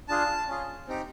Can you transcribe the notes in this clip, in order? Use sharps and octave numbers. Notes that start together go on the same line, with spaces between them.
D4 F4 G#4 A5
C#4 F4 G#4
C4 D#4 G4